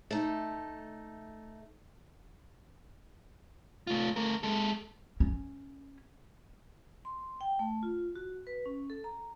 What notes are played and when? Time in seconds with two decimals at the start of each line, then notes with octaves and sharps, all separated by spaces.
0.11 A3 D#4
3.87 A3 F4
4.16 A3 A#4
4.43 G#3 A4
5.20 C#4
7.05 C6
7.41 G5
7.59 A3
7.83 F4
8.16 F#4
8.47 B4
8.66 C#4
8.90 A4
9.04 A#5